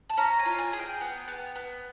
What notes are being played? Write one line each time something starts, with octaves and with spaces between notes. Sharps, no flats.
A5
C#4 A#5
G#5
F4
G#5
G#4 G#5
G5
B3
B3
B3